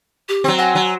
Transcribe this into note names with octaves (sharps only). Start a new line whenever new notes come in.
G4
F#3 C4
F#5 G#5 A#5
F#3